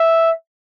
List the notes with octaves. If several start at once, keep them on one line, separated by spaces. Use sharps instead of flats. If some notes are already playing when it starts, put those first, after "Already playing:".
Already playing: E5